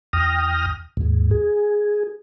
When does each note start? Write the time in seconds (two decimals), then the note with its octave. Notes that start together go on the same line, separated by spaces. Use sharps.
0.13 E2 G5 D#6 F6 A#6
0.97 D#2 G#2
1.31 G#4